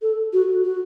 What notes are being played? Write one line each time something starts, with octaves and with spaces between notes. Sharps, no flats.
A4
F#4
F#4